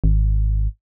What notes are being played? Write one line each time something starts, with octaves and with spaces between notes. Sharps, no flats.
G#1